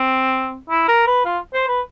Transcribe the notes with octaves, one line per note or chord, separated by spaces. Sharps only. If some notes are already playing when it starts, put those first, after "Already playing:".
Already playing: C4
E4
A#4
B4
F4
C5
B4